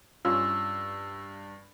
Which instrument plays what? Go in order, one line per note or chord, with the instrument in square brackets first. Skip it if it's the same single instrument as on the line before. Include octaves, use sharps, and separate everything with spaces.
[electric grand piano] G2 [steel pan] C#4 F4 [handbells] E6